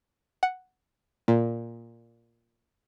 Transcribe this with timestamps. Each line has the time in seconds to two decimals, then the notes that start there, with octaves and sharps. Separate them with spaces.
0.43 F#5
1.28 A#2